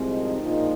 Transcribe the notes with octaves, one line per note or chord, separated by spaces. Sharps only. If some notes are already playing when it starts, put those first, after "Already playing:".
Already playing: C2 C3 F3 G#3
D#3 D#4
A#1 A#2 F3 G#3